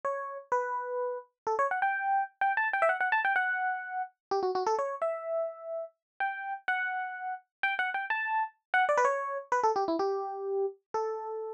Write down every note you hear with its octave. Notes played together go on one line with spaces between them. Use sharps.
C#5
B4
A4
C#5
F#5
G5
G5
A5
G5
E5
F#5
F#5
A5
G5
F#5
G4
F#4
F#4
A4
C#5
E5
G5
F#5
G5
F#5
G5
A5
F#5
D5
B4
C#5
B4
A4
G4
E4
G4
A4